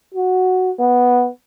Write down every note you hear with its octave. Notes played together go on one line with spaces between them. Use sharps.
F#4
B3